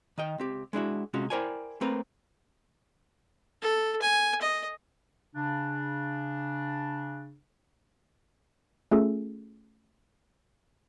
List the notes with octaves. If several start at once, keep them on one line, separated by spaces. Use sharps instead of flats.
D#3 D#5 G5
C#2 C4 G4
G#3 D4 E4 F#4
C3 G#3 C#4 F4 F#4
E4 A#4 C5 D5 G5 G#5
A3 A#3 C4 A#4 B4
A4
G#5
D#5
C#3 D4
A3 C#4 F4 G#4 A4